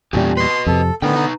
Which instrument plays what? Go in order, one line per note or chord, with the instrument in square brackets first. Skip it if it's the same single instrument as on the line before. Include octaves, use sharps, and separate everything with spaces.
[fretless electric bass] E2 A#2 G3 [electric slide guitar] A3 C#4 G4
[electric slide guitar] B4 D#5 [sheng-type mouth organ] C6
[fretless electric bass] F2 C3 [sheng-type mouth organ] A4
[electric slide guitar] A2 D#3 G5 [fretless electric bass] D3 [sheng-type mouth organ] B3
[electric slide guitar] D#4 B4 A#5